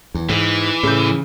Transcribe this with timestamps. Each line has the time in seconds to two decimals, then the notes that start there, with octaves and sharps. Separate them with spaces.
0.14 E2
0.29 G#2 E3
0.83 A2 C#3 G6